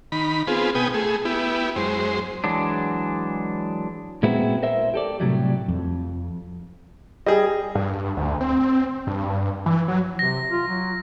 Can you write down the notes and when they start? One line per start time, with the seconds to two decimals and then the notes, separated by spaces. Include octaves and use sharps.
0.12 D#3 B5
0.47 B3 C4 F4 G#4
0.75 B2 B3 G5 G#5 D#6
0.94 A3 G#4
1.25 B3 E4 G4
1.76 F#2 G#3 C5
2.44 E3 F#3 G#3 D4
4.23 A#2 G#3 B3 C4 E4 F#4
4.63 A#4 C5 E5
4.94 G4 A4 D5
5.20 A2 C3 F#3 G3
5.68 F2
7.26 G3 G#4 D#5
7.75 G2
8.17 D2
8.41 C4
9.07 G2
9.66 E3
9.88 F#3
10.19 C3 A#6
10.50 F4
10.68 F#3